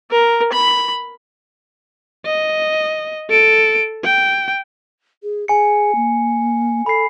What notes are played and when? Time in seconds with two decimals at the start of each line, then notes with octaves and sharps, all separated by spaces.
0.11 A#4
0.52 B5
2.26 D#5
3.30 A4 D7
4.04 G5
5.23 G#4
5.48 G#4 G#5 C#7
5.95 A#3
6.86 A4 B5 C7